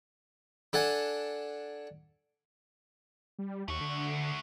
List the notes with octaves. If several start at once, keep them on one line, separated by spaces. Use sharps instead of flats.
D4 A4 F#5 G#5
G3
D#2 A3 F#4
D3